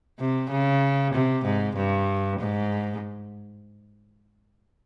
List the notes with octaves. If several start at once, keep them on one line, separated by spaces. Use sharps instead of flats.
C3
C#3
C3
G#2
G2
G#2